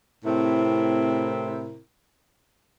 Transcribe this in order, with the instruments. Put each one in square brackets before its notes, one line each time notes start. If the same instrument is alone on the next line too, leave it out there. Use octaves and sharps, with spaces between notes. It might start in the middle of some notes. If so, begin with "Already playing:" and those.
[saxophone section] A2 C3 C4 E4 A#4